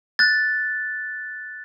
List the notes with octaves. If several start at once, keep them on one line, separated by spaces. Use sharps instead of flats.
F#6 A6